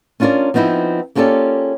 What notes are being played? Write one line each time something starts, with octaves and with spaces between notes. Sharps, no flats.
C#4 D4 F4 F#4 A#4 D5
F3 B3 C4 D#4 E4
A#3 C#4 F4 G4 A4 D5